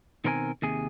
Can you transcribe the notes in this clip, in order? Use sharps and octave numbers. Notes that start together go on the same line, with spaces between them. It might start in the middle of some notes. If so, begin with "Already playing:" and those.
B2 D#3 C4 A#4 C#5 G#5
D#2 C3 G#4